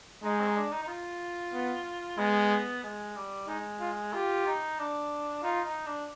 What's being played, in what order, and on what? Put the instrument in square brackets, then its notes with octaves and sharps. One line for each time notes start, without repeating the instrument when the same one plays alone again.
[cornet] G#3 [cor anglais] D#4
[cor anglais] C4
D#4
D4
D#4
D#4
F4
[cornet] B3
[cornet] G#3 [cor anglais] B3
[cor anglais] G#3
G3
[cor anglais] G#3 [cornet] D#4
[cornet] F4
[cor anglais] F4 [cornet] G4
[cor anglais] D#4
D4
[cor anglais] D#4 [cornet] F4
[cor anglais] D#4
D4